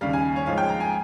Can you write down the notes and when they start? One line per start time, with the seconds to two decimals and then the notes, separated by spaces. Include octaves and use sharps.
0.01 D#2 C#3 G3 F5
0.13 G#5
0.36 C#5
0.46 G#2 F3 G#3 F5
0.58 G5
0.69 A#5
0.80 G#5